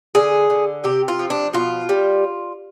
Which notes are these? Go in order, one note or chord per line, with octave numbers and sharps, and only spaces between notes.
D3 G#4
D3
C3 G4
F4
F3
D4
B2 F4
G3